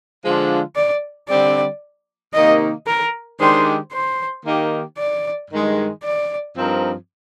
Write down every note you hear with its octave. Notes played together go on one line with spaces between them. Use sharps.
D3 F3 G#3 D4 F4
D5
D3 G3 C4 G4 D5
C3 D#3 A#3 D#4 D#5
A#4
D#3 G#3 D4 G4 C5 D5
C5
D#3 A#3 D#4 G4
D5
G2 D#3 G#3 D#4
D5
G2 F3 C4 D#4 A#4